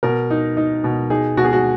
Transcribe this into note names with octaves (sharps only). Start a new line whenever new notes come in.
B2 A#4
D#4
D#4
B2
D#4 G#4
B2 F#4
G#4
F#4